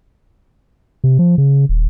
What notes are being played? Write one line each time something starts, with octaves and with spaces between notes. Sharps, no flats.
C3
F3
C#3
D#1